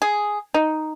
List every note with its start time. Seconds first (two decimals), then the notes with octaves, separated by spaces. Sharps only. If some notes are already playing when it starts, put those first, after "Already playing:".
0.02 G#4
0.54 D#4